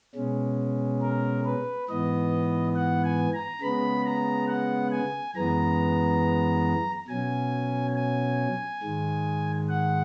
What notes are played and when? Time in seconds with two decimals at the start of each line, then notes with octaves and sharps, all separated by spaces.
0.15 B2 G#3 C#4
1.01 A#4
1.45 B4
1.89 G#2 E3 B3 D#5
2.76 F#5
3.04 G#5
3.34 A#5
3.62 C#3 G#3 B3 B5
4.05 A#5
4.48 F#5
4.92 G#5
5.35 F#2 E3 G#3 B3 A#5
7.08 B2 F#3 C#4 G#5
7.95 G#5
8.83 G#2 D#3 G#3
9.69 F#5